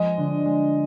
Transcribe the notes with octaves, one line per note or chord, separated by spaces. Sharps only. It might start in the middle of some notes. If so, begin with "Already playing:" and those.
Already playing: F3 G#3 C4 D#5
D3
G#3